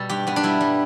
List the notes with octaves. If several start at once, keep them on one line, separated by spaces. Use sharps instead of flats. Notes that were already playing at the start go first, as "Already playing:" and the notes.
Already playing: B2 G3 A4
G2 G4
G2 B3
D4
G3 E4
G3